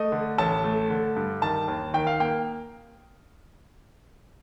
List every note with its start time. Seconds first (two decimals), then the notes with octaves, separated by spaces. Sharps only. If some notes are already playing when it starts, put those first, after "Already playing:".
Already playing: A3 D#5
0.12 D3
0.38 A1 A5
0.64 A3
0.90 D3
1.16 G2
1.42 D#3 A5
1.68 D#2
1.94 D#3 G5
2.07 F5
2.20 A#3 G5